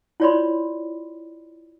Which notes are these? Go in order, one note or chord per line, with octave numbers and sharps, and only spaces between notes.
E4 F4 C#5 D5 B5 C6